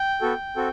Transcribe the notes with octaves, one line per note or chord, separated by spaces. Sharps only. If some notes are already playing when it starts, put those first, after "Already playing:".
Already playing: G5
B3 F#4 A4
C4 F#4 A4